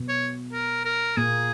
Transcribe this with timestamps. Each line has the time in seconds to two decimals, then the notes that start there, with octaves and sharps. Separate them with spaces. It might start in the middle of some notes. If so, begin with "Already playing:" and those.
Already playing: B2 B3
0.09 C#5
0.53 A#4
0.85 A#4
1.17 A#2 A#3 G#4